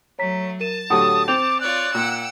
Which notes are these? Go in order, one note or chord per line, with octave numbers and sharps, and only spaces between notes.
F#3 A3 C#5 A#5 B6
A#4 A5 D#7 E7
A2 D3 F#3 G4 A4 F#5 D#6
C4 G5 D6 G6 F7
F4 C#5 D5 F#6
A#2 F#5 G5 E6